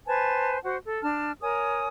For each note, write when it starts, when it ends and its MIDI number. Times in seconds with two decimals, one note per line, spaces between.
0.06 0.58 71
0.06 0.58 72
0.06 0.58 80
0.06 0.58 81
0.63 0.77 66
0.63 0.77 72
0.63 0.77 78
0.85 1.00 69
1.02 1.32 62
1.02 1.32 81
1.02 1.32 89
1.42 1.88 70
1.42 1.88 73
1.42 1.88 80
1.42 1.88 87